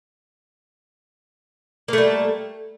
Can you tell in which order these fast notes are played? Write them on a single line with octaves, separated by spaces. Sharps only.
A#3 A3 G3